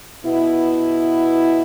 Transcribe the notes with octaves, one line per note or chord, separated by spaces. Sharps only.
B2 B3 E4